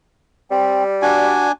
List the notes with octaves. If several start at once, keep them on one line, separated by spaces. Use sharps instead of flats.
G3 C4
D4 F#4 G#5